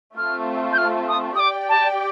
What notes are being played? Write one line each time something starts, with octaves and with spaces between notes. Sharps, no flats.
A3 C4 F4 F6
G6
F6
D#6
D#6
G4 D5 G5 D6
A5